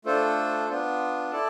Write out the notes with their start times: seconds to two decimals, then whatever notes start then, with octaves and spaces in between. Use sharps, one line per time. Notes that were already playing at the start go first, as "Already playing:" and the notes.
0.05 A3 D4 F4 A4 C5
0.69 B3 D4 F4
1.31 E4 A4 D5 A5